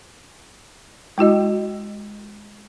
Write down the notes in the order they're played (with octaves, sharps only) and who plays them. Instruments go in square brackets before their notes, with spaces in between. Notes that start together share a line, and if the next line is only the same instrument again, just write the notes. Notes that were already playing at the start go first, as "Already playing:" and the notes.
[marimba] G#3 E4 F#4 D#5